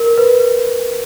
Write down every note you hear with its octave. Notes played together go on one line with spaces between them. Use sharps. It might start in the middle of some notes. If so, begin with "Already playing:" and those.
Already playing: A#4
B4